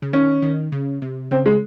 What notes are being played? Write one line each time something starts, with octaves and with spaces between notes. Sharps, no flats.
C#3
D#3 C#4
D#3
C#3
C3
C#3 C4
G#3